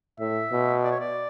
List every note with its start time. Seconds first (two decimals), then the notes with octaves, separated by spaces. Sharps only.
0.19 A2 E5
0.52 B2
0.84 D5
0.92 C#5
1.00 D5